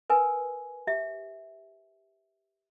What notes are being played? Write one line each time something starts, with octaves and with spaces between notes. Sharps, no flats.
A#4 B4 G#5
G4 E5